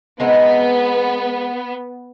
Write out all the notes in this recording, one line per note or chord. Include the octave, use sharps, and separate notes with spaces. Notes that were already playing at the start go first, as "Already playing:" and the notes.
G#3 B3 C4 D#4